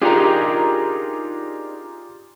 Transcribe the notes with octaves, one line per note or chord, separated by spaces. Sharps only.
D4 D#4 F4 G4 G#4 A#4